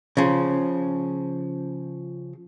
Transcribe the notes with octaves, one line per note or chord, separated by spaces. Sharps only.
C#3 F3